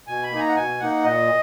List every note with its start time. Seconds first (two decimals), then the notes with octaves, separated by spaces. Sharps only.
0.07 B2 G#5
0.23 B5
0.31 A#3 D#4 G#5
0.39 A#5
0.48 F#5
0.55 B2 G#5
0.80 A#3 D#4 F#5
1.03 A#2 D#5